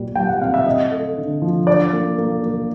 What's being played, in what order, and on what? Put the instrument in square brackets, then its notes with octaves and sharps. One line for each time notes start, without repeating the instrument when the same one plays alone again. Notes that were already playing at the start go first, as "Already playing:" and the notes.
Already playing: [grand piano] A#2 G3
G3 G5
F#5
C4 F5
E5
C4 D#5
A3
D3
F3
D4 D5
A#3
A#3
A#3